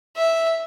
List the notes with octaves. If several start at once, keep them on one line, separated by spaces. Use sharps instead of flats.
E5